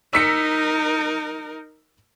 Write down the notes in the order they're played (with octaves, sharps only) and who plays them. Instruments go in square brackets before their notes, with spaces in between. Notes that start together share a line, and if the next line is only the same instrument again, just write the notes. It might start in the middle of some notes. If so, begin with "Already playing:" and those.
[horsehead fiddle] D#4 A#4 [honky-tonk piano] E6 B6 C#7